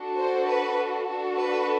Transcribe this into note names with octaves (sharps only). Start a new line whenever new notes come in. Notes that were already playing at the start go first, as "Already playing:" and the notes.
Already playing: D4 F#4 A4
C5
B4
D4 F#4 A4
B4